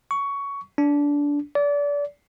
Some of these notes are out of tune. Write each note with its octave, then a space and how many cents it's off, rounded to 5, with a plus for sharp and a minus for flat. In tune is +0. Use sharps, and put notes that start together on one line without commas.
C#6 +15
D4 -20
D5 -30